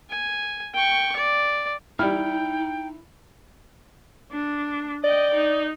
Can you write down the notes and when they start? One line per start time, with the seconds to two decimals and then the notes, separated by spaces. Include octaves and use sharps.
0.10 G#5
0.74 G5 C#6
1.16 D5
1.99 G3 D#4 E4 G5 F6
4.32 D4
5.04 D5 D#5 G5
5.35 D#4